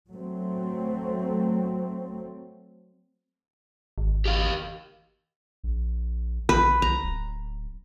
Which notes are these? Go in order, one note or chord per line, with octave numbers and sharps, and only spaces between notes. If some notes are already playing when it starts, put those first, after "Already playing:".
F#3 A3 C4
G#1
G4 A#4 F5
A#1
A#1 B4
B1 A#5
D1